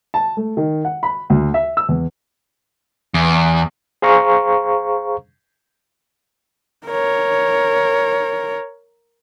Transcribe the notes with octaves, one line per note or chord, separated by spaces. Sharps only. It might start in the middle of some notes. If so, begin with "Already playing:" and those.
A5
A3
D#3
F#5
B5
D2
E5
E6
E2
E2
G#4 C5 F5 A#5 C#6
A#4 C#5